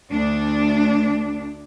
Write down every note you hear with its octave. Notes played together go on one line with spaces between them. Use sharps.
D2 D4